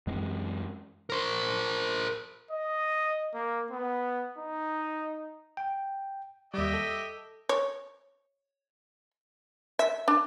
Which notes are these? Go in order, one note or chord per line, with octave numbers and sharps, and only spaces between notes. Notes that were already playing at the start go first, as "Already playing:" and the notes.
F#2 E3 G#3 C4
A#4 C5
D#5
A#3
B3
D#4
G5
D#2 G3 G4 D#5 E5
A4
C#5
E5
D4